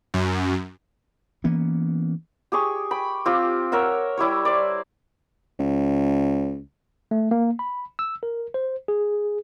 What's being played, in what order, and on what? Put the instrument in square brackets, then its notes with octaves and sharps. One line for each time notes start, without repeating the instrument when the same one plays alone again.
[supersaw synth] F#2
[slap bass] E3 A#3 B3 C#4
[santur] G4 G#4 C#6
G5 B5
C4 F4 G4
A#4 C#5 E5 F#5
G3 E4 G4 C#5
C5 D5
[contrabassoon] C#2
[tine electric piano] A3
A#3
B5
E6
A#4
C5
G#4